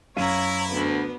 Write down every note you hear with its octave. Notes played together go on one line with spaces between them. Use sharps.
F#2 E4 C#5 F5 A#5 D#7
D2 B3